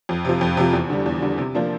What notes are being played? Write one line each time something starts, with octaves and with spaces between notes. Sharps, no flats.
F2
C3 F3
F2
C3 F3
E2
D3 G3
E2
D3 G3
C3
F3 A#3 D4